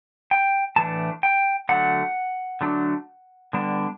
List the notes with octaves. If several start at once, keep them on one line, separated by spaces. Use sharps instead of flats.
G5
A2 E3 A3 D4 A5
G5
D3 F#3 A3 D4 F#5
D3 F#3 A3 D4
D3 G3 B3 D4